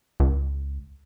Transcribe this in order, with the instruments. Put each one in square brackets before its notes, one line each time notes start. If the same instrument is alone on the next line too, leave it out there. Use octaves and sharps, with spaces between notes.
[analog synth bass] C#2